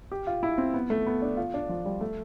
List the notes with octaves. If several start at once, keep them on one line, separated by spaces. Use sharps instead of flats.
G4
F4
E4
C4
B3
A3
B3
D4
F4
D4
F3
G3
A3